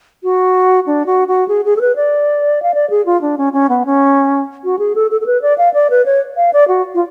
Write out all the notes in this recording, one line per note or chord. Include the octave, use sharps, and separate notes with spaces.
F#4
D4
F#4
F#4
G#4
G#4
A4
B4
D5
F5
D5
G#4
F4
D4
C#4
C#4
B3
C#4
F#4
G#4
A4
A4
A4
B4
D5
F5
D5
B4
C#5
F5
D5
F#4
F4